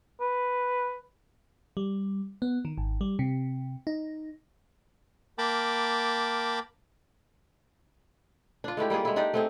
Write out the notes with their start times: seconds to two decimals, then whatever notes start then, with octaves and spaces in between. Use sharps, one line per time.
0.20 B4
1.77 G3
2.42 B3
2.65 D#3
2.78 G#1
3.01 G3
3.19 C3
3.87 D#4
5.38 A#3 A#4 G5 A5 B5 D6
8.64 D4 F4
8.77 G#3 A3 E4 G4
8.90 G3 A#3 F4 G#4
9.05 G#3 E4
9.16 D4 D#4 G4 D5
9.34 A3 C4 G#4